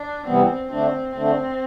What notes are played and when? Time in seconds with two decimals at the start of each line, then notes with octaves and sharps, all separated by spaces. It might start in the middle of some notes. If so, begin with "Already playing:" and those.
Already playing: D4
0.26 C3 E3 G3 B3 C4
0.70 D3 A3 C4 D4
1.15 D3 A3 C4 D4